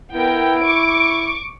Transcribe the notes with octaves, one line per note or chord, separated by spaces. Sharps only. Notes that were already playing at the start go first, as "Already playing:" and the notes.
B3 E4 A#4 G5
C#6 D6 D7